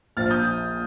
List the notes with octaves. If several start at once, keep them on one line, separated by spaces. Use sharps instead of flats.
A#1 A#2 F3 F6 A6
D#6 G6